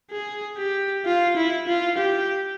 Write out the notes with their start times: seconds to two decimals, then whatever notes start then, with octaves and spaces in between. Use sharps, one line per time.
0.11 G#4
0.58 G4
1.06 F4
1.37 E4
1.68 F4
1.98 G4